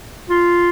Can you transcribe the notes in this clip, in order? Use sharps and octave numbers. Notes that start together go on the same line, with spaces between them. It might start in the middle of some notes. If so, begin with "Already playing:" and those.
F4